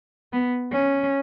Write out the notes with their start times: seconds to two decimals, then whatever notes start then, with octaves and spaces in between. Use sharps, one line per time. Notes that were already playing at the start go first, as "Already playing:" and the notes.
0.32 B3
0.73 C#4